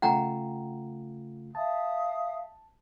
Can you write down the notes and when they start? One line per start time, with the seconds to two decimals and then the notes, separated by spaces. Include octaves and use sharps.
0.02 C#3 A3 F4 F#5 G5 A#5
1.55 E5 F5 A5 D#6